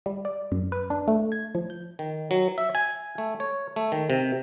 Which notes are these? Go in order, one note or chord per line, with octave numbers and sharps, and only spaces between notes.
G3
D5
F#2
B4
D4
A3
G#6
F3
G6
D#3
F#3
E5
G#5
A3
C#5
A3
D#3
C3